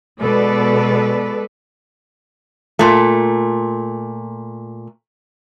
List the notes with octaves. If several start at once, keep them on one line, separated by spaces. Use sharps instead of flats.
B2 G#3 A4 B4 D5
A#2 A3